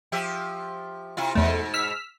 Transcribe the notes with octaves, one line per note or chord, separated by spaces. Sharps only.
F3 G4 E5
C3 E4 F4
E2 G#2 B2 A3
E6 F6 B6